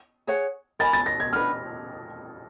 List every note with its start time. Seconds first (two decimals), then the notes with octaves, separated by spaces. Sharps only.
0.27 G#4 C#5 F#5
0.79 A#4 D#5 G#5 B5 A6
0.93 A6
1.06 A#6
1.20 G#6
1.33 D4 F#4 B4 F6